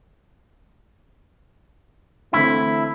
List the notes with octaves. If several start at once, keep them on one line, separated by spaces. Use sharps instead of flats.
D3 E3 A3 C4 E4